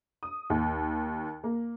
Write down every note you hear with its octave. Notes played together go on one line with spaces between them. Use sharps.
D#6
D#2
A#3